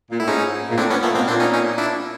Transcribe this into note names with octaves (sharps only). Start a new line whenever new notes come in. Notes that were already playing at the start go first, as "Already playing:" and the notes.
A#2
A2 E4
G#2 C#4 D#4
A#2
A2 C4 D4
B3 C#4
A#2 A3 B3
B2 A#3 C4
A#2 C4 D4
C#4 D#4
C#4 D#4
D4 E4